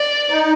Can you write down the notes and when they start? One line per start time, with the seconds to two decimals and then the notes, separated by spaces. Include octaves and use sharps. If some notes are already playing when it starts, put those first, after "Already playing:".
Already playing: D5
0.30 D#4